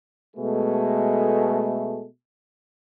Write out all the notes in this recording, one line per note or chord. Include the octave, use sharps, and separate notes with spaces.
B2 G#3 A3